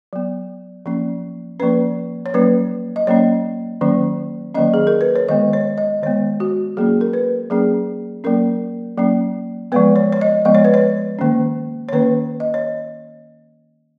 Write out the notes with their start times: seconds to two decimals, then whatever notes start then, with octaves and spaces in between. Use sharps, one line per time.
0.13 F#3 B3
0.86 F3 A#3 C#4
1.60 F3 A#3 C#4 B4
2.26 C#5
2.34 F#3 A#3 C#4 B4
2.96 D#5
3.07 F#3 A#3 C#4 C#5
3.81 D#3 F#3 A#3 C#4
4.55 D#3 F#3 A#3 C#4 D#5
4.74 G#4
4.87 A#4
5.01 B4
5.16 C#5
5.28 D#3 G#3 B3 D#5
5.53 C#5
5.78 D#5
6.02 D#3 G#3 B3 C#5
6.40 F#4
6.77 F#3 A#3 C#4 G#4
7.01 A#4
7.13 B4
7.50 F#3 A#3 C#4 G#4
8.24 F#3 A#3 C#4 A#4
8.98 F#3 A#3 C#4
9.72 F3 G#3 B3 B4
9.96 C#5
10.12 C#5
10.21 D#5
10.45 F3 G#3 B3 D#5
10.55 C#5
10.65 B4
10.74 C#5
11.19 D#3 A#3 C#4
11.89 C#5
11.93 D#3 A#3 C#4 B4
12.40 D#5
12.54 C#5